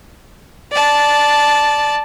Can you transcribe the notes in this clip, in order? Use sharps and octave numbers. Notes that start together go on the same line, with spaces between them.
D5 A5